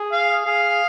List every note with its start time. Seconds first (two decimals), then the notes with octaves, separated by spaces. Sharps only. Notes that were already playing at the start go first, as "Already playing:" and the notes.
Already playing: G#4
0.12 F5
0.46 G#4 F5